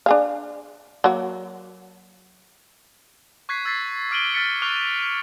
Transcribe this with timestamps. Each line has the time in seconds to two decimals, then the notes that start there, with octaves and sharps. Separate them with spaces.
0.06 D4 G#4 F5
1.04 F#3 A#3 F#4
3.49 C#6 F#6 G#6 B6 C7
3.65 E6 G#6 A6 B6 C7
4.11 D6 F6 D7 D#7 F#7 G7
4.34 F6 A6 B6 C#7
4.62 C#6 D6 F6 F#6 F7 G7
4.86 F7